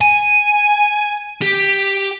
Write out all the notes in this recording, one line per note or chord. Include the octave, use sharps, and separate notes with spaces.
G#5
G4